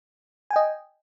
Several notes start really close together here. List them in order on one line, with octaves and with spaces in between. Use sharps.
G#5 G5 D#5